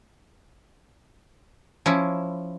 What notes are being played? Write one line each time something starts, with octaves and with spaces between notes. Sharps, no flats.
F3 C#4 E4